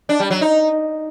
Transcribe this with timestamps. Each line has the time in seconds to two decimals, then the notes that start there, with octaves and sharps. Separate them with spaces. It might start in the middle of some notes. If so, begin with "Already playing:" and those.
0.09 D4
0.20 G3
0.31 F#3
0.41 D#4